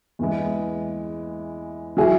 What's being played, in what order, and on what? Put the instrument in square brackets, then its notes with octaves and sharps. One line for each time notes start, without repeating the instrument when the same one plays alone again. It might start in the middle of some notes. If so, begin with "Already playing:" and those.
[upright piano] E2 E3 G#3
F#3 E4 G#4